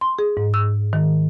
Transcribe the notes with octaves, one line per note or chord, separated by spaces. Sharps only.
C6
G#4
G#2
E6
D#3